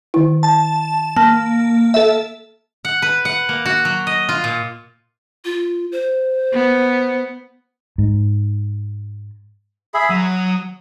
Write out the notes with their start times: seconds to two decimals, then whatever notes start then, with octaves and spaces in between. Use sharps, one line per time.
0.14 D#3 E4
0.43 A5
1.17 A#3 A5
1.94 A4 E5
2.85 F#5
3.02 B4
3.25 F#5
3.49 A#3
3.66 F#4
3.85 F#3
4.07 D#5
4.29 F4
4.44 A#2
5.45 F4
5.92 C5
6.53 B3
7.98 G#2
9.94 G#4 E5 B5
10.10 F#3 D#6